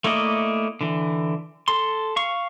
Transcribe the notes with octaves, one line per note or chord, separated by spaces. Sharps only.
A3 A#3 E4 D5 D#5
D3 E3
A4 C6
F5 C#6